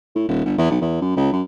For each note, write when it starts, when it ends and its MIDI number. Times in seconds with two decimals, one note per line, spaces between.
0.15 0.26 45
0.28 0.42 27
0.46 0.57 31
0.58 0.68 40
0.70 0.78 35
0.81 0.97 40
1.01 1.12 42
1.16 1.29 37
1.32 1.42 42